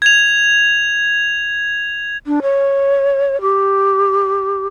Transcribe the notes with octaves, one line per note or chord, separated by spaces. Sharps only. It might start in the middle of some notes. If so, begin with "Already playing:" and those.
G#6 F7
D4
C#5
G4